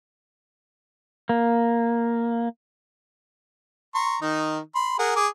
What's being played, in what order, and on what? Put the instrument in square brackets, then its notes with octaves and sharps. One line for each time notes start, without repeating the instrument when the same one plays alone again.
[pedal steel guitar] A#3
[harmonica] A#5 C6 C#6
D#3 D#4
B5 C6
G#4 A#4 F#5
G#4 D6